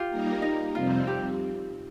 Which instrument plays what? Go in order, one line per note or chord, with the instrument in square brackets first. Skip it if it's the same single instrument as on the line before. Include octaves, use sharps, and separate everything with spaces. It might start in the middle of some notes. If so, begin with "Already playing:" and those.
Already playing: [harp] F4 G4
[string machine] G3 A#3 D#4 A#4
[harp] D#4
[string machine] F2 C3 G3 C4 [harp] F4
[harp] G4